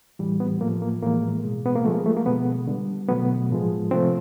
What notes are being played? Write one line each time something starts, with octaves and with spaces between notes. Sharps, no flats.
A2 E3 G3
B3
A2 F3 A3 A#3
A#3
A2 E3 G#3 A#3
B2 G#3
B3
A#3
D3 F3 G#3 A3
A#3
A3
A#3
B2 G#3 B3
D3 G3
B2 F#3 A3 B3
A2 F3 G#3
C3 F3 A3 C4